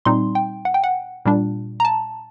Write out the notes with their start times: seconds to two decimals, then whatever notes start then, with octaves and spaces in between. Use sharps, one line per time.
0.05 A#2 G3 C4 D#4 C6
0.35 G5
0.65 F#5
0.74 G5
0.84 F#5
1.25 A#2 G3 D4
1.80 A#5
1.85 A5